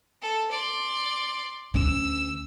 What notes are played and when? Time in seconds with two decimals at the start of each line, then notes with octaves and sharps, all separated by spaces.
0.22 A4
0.51 D5 C6
1.74 D2 C#4 E6